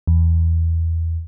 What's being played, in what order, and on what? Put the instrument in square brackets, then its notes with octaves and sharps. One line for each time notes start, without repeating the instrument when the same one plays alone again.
[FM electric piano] E2